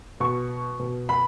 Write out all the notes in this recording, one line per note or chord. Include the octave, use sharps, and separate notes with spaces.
B2 C#6
B2
B5